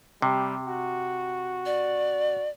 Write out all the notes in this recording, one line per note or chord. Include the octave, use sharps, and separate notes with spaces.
C3 G3
F#4
D5